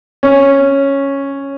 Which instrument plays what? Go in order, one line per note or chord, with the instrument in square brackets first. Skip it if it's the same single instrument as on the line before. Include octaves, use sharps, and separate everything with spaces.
[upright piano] C#4